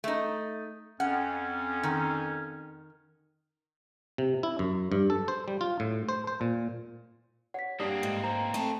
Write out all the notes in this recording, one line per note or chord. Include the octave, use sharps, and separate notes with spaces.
A3 D#4
F2 C#4 F#5
D#3
C3
E4
F#2
G2
A4
C5
G3
F4
A2
C5
C5
A#2
C#5 F#5 B6
G2 A#3 C4 D4 D#6
G#2
C5 A#5
A3 C4 D#5 A5